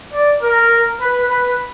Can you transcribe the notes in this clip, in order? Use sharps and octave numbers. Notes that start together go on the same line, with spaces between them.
D5
A#4
B4
B4